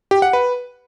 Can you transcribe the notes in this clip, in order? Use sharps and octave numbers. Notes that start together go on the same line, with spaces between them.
G4
F#5
B4